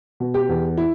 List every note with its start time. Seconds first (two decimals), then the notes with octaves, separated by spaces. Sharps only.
0.20 B2
0.34 G4
0.49 E2
0.78 E4